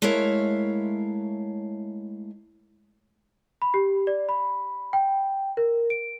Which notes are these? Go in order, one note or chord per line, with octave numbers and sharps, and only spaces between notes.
G#3 A3 E4 A#4 C#5 F5
B5
G4
D5
B5
G5
A#4
D7